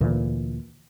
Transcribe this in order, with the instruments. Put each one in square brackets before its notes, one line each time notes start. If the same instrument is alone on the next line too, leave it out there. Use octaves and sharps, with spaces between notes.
[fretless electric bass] D2 A#2 E3